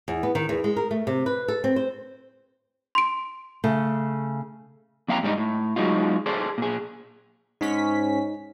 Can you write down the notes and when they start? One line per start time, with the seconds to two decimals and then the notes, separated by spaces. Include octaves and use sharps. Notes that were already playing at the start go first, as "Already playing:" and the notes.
0.08 E2
0.23 B3
0.35 D#3
0.49 E2
0.64 G#3
0.76 A#4
0.91 A3
1.07 C3
1.26 B4
1.48 A4
1.64 C4
1.76 C5
2.95 C6 D7
3.64 C#3 A3
5.08 F2 A#3 F5 G5 A#5
5.23 G#2 G3 B3 D#4
5.38 A2
5.76 F#3 G#3 D#4 F4
6.26 G#4 A4 C5 D5
6.58 A#2 G#4
7.61 G#2 C#4 D#4 B6